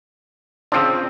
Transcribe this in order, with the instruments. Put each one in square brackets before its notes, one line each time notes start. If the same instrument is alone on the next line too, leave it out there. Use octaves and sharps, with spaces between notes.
[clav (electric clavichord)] C#3 F3 D4 [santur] C4 G5